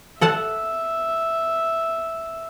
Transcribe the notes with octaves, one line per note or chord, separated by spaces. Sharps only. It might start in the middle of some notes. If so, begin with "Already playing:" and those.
A4 E5 F#5 A5